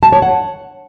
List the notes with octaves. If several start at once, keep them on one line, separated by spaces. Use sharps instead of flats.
A5
C#5
F#5